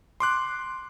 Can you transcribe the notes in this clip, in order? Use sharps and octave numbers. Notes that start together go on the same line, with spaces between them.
C6 D6 F#6